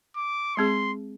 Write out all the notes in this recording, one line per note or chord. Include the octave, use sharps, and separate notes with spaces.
D6
G#3 C4 G#4 C6